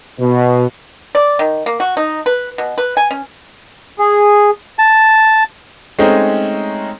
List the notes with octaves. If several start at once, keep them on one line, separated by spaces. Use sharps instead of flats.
B2
D5
D#3
A#3
F#4
D#4
B4
B2
B4
G#5
C#4
G#4
A5
G#3 A3 C4 C#4 D#4